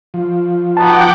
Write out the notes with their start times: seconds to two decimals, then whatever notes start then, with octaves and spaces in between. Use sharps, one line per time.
0.14 F3
0.77 B3 D#4 F#4 F#5 G5 A5 D6